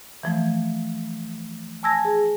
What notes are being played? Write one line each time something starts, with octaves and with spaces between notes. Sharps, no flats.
E3 F3 A3
G#5 A5 E6 G#6 A#6
G#4